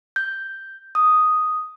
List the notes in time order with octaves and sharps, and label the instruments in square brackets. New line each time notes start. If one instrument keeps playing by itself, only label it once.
[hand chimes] G6
D#6